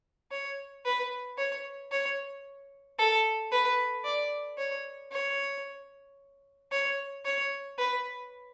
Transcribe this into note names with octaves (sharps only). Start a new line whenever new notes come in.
C#5
B4
C#5
C#5
A4
B4
D5
C#5
C#5
C#5
C#5
B4